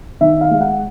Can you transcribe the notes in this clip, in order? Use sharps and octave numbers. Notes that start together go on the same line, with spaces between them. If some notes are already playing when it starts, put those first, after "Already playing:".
D#3 E5
F5
G#3
F#5